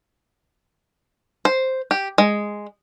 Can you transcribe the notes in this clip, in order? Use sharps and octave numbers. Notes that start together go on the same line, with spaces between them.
C5
G4
G#3